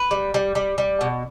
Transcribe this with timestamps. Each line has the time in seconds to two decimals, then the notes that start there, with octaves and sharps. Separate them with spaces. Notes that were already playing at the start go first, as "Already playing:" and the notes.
Already playing: B4
0.11 G3
0.34 G3
0.55 G3
0.78 G3
1.01 B2